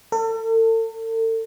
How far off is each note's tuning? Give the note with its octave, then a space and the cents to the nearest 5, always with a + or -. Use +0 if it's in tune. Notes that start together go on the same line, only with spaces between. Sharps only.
A4 +40